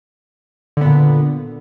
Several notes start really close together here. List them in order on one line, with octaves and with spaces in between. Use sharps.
D3 B3 A#2